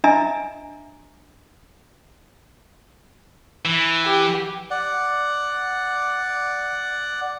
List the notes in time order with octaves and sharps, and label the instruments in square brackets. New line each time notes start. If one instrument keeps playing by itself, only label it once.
[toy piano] D4 D#5 E5 G#5 A#5
[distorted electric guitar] E3
[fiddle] G4
[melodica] D5 F#5